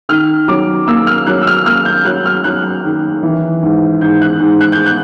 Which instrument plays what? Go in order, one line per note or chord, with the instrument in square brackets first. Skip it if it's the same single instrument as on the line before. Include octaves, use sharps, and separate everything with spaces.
[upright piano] D#3 F6
F#3 D6
A#3 E6
F6
F#3 F#6
E6
F6
A#3 F6
G6
F#3 F#6
F6
F#3 F#6
D#3
E3
G#2
G#2 G6
F#6
G#2
F#6
G6
F#6